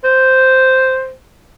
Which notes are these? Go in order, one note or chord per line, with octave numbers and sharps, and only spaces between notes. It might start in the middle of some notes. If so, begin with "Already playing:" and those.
C5